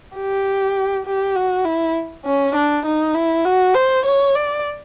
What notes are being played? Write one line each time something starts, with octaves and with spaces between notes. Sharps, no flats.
G4
G4
F#4
E4
C#4
D4
D#4
E4
F#4
C5
C#5
D5